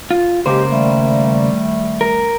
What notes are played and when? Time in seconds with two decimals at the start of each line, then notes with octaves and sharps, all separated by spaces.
0.11 F4
0.46 C#3 G#3 A#3 G4 C5
0.70 D#3 G3 A3
2.01 A#4